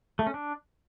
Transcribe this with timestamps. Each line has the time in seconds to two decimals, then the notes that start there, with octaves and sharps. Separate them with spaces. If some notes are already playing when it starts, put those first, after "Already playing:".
0.19 A3
0.27 C#4
0.34 D4